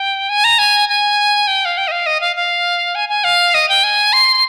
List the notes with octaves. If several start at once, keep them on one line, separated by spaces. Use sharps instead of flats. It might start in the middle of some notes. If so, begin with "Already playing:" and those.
Already playing: G5
G#5
A#5
G#5
G#5
G5
F5
G5
D#5
F5
D#5
F5
F5
G#5
G#5
F5
D#5
G5
G#5
C6